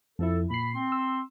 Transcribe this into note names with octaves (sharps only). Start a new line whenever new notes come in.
F2 F3 E4 A4
A#2 B5 C7
C4 C6
E6